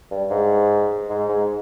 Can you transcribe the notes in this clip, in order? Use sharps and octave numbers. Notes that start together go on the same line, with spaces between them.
G2
G#2
G#2
G#2